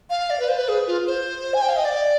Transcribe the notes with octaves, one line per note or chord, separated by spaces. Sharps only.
F5
D5
B4
C5
B4
G#4
F4
C5
G#5
G5
F5
D#5
D5